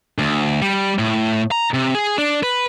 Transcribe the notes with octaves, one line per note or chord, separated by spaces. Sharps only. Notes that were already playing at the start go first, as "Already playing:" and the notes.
D2
G3
A2
A#5
C3
G#4
D4
B4